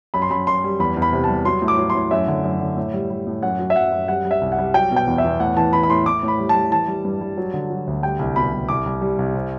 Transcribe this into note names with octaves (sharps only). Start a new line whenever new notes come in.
F#2 B5
C6
F#2 B5
F#2 C6
G3
E2 B5
E2
B5
C3
A5
G3
F#3 C6
A2
D6
F#3
C6
A2
F#2 E5
D3
F#2
D3
A2
G3
G3
A2
F#2 F#5
F#3
E5
F#2 F#5
F#2
G3 F#5
G3
E5
C2
F#5
G3
F#3 G5
B2
G5
E2
E5
E2
A2 F#5
E3 A5
E3 B5
B5
A2 C6
A2 D6
A2
B5
G3
A5
G3
E3 A5
G3
G2
G3
F#3
D3
F#3
D2
G3 G5
C2
B2 B5
C2
C2 D6
C2
G3
C2
C3